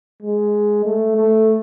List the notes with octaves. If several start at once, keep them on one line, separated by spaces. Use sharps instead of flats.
G#3
A3
A3